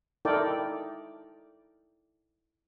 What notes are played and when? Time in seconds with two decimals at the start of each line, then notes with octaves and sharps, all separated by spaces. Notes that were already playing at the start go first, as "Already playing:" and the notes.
0.25 D#4 E4 A4 A#4 D5 G5